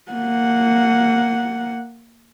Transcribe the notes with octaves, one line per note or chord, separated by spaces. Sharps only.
A#3 F#5